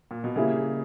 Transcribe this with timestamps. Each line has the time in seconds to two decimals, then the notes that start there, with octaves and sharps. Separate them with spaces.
0.11 A#2
0.24 B2
0.36 C#3 G3 A#3 E4 G#4